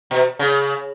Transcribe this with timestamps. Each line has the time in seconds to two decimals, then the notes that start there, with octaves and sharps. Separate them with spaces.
0.11 B2
0.39 C#3